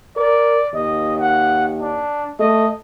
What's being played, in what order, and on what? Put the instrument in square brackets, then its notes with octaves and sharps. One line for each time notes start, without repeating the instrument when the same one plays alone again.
[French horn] A#4 [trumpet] D5
[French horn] D#2 [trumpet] D#5
[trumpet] F#5
D4
[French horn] A3 [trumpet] D#5